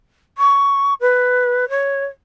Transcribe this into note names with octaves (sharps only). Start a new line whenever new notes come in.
C#6
B4
C#5